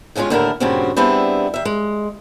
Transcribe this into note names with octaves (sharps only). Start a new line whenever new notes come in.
G2 C#3 G#3 C#4 F4
D#2 A2 D3 E4 A4 A#4
G2 A#2 C#3 C4 C#4 F#4
G3 B3 C4 D4 E4 G#4
D#3 E5
G#3